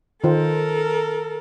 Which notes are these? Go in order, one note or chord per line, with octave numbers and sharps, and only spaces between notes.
D#3 F4 A4 A#4 C5